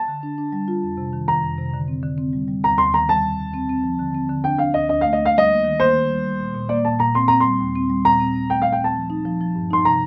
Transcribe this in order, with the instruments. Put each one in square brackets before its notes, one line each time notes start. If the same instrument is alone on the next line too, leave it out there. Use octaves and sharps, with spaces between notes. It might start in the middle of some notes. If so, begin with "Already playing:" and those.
Already playing: [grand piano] A5
[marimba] D3
D4
D4
G3
F4
F2
C3
D#3
[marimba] D#3 [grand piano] A#5
[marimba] F2
C3
D3
C4
D3
C4
G3
G3
[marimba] D#2 [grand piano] A#5
[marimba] D#2 [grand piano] C6
[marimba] D#3 [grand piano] A#5
[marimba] G3 [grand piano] A5
[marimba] G3
D#2
C4
C4
F3
D3
C4
D3
[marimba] D4 [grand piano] G5
[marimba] D4 [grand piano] F5
[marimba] D2 [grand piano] D#5
[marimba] D4 [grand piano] D#5
[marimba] A3 [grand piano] F5
[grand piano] D#5
[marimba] A3
[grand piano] F5
[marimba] G3 [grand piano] D#5
[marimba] A#3
D#3
[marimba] A#3 [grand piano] C5
[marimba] D#3
G3
G3
A#2
A#2
[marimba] A#3 [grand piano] D5
[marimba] A#2 [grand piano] A5
[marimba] A#2 [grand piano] A#5
[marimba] C4 [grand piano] C6
[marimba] C4 [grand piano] A#5
[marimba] G3 [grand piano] C6
[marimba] D#2
C4
G3
[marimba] A#2 [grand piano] A#5
[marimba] C4
C4
[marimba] A3 [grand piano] G5
[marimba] A#2 [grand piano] F5
[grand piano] G5
[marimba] C4 [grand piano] A5
[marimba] F3
D#4
F3
F3
G2
[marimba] D#4 [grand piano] C6
[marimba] C3 [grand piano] A#5